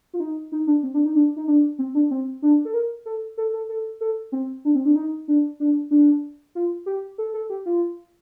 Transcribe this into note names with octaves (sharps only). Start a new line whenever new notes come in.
F4
D#4
D#4
D4
C4
D4
D#4
D4
D#4
D4
C4
D4
C4
D4
A4
A#4
A4
A4
A4
A4
A4
C4
D4
C4
D4
D#4
D4
D4
D4
F4
G4
A4
A4
G4
F4